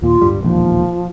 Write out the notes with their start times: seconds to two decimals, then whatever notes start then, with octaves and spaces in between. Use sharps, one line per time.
0.02 D#2 A#2 F4
0.21 D1 G2 G3
0.41 E1 A#1 D#2 F3